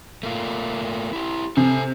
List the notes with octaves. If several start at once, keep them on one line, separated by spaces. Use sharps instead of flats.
A3 A#3 F4
E4 G4
C3 A4 G#5